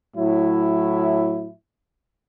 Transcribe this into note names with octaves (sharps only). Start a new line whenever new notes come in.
A2 F#3 E4